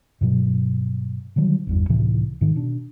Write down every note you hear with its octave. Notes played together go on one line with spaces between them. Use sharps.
G2 B2 F#3
D3 D#3 F#3 G3
G#1 E2 G2
C#2 A2 C3 E3
G#2 D#3
B2 D4